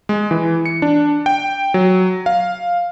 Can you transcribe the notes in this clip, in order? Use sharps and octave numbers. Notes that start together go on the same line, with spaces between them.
G#3
E3
C#7
D4
G5
F#3
F5